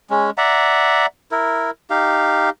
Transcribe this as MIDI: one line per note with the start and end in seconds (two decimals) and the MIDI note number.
0.10 0.30 56
0.10 0.30 61
0.38 1.06 74
0.38 1.06 76
0.38 1.06 78
0.38 1.06 82
1.31 1.71 64
1.31 1.71 70
1.90 2.50 63
1.90 2.50 67
1.90 2.50 77